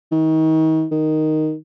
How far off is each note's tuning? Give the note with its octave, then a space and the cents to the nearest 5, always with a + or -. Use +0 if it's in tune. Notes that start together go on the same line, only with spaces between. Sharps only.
D#3 +35
D#3 +0